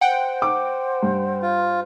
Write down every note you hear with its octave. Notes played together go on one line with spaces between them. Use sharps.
C5 F#5 G5
D6
G2
F4